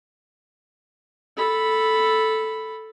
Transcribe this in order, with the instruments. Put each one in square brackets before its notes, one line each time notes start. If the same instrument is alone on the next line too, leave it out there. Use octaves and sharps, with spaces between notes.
[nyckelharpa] A4 B5